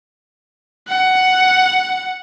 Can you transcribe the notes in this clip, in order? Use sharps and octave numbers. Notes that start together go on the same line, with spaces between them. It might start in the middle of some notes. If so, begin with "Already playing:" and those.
F#5